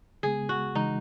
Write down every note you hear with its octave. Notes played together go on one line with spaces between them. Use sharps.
C#3 G#3 B3 G#4
F#4
C#3 E3 G#3 D#4